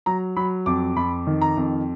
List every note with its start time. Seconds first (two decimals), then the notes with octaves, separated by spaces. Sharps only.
0.06 F#3 A#5
0.36 F#3 B5
0.66 F2 D6
0.96 F2 B5
1.27 D#3
1.42 A#5
1.57 F2